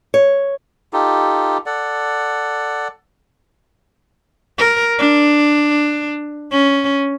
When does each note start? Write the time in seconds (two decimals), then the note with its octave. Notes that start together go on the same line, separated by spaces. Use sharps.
0.14 C#5
0.93 D#4 F4 G4 A4
1.66 A4 D5 F#5
4.58 A#4
4.99 D4
6.51 C#4